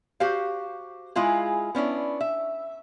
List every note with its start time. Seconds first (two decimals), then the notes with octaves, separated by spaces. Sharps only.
0.20 F#4 G4 C5 F5
1.16 G#3 E4 F4 G#4
1.75 B3 C#4 D4 E4
2.21 E5